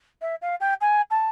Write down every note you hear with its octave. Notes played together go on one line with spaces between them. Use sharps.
E5
F5
G5
G#5
A5